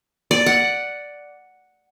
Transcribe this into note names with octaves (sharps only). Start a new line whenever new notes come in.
D5
F#5